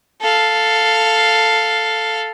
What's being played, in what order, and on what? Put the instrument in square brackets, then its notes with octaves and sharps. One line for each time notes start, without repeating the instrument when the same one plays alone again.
[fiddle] A4 F5